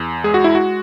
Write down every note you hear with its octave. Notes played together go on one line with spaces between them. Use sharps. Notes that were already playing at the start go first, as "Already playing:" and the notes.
Already playing: E2
G#3 G#4
F#4
E4
F#4